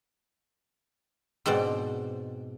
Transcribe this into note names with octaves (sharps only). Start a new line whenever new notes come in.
G#2 B2 C4 D5